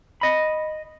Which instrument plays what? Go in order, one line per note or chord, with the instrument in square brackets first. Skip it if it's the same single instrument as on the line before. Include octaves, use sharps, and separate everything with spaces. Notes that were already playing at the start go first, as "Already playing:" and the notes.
[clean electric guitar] D#5 B5